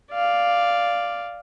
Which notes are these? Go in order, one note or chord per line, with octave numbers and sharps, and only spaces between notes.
D5 F5